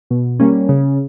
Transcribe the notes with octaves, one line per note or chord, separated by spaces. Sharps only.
B2
G3 A#3 C#4
C#3